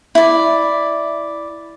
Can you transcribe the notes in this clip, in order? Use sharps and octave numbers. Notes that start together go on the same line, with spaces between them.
E4 D5